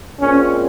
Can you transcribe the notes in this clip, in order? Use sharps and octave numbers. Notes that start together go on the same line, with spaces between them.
A#2 G#3 C4 C#4